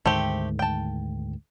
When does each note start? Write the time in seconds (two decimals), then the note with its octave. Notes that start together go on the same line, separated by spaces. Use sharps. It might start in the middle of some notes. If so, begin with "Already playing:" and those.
0.06 D2 G#2 D#3 A3 C4 G4
0.59 G5 A5